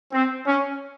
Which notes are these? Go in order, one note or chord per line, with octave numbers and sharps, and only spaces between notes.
C4
C#4